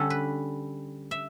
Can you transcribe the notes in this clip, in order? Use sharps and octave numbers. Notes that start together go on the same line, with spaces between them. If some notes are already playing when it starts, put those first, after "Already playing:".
Already playing: D3 G3 C#4 A4
B4
E5